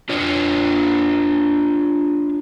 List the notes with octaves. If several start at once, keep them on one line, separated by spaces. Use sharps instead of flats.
D4 F4 C#5